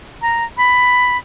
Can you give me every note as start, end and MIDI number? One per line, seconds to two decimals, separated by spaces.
0.22 0.44 82
0.58 1.17 83